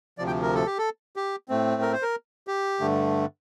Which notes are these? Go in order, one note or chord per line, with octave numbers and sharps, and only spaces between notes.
D2 C3 F3 D5
G5
A#4
A4
G4
A4
G4
A2 A3 C4
A#4
C5
A#4
G4
G2 D3 A3